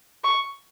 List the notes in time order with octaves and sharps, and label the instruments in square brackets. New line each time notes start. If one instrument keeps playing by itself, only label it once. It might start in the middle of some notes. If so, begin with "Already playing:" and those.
[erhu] C#6